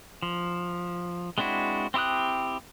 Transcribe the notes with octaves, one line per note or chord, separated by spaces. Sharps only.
F3
G#3 C4 D4 E4 F#4
C4 E4 G4 D#6 F#6